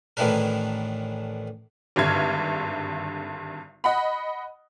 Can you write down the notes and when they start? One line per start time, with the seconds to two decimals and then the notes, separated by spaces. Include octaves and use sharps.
0.17 A1 A2 D#3 E3 D4 A#4
1.96 G#1 G2 D3 E5 F6 G#6
3.84 D#5 F#5 B5